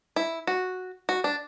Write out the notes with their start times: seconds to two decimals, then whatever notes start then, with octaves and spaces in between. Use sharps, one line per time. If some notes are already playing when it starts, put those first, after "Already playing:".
0.16 E4
0.47 F#4
1.09 F#4
1.24 D4